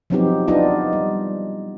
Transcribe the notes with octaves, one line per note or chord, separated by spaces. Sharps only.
F3 F#3 B3 C4 D#4 G4
B3 D4 D#4 F4 D#5
G3